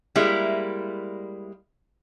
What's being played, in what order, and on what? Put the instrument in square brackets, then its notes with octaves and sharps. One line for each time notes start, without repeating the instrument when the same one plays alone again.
[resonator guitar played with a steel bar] G3 G#3 A#3 E4